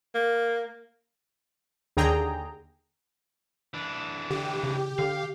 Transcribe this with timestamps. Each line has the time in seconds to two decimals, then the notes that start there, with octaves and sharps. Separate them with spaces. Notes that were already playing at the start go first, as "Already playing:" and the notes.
0.15 A#3
1.97 D#2 D3 G#4 G5 A#5
3.74 E3 D4
4.30 D3 G4
4.64 C#3
4.99 D3 F5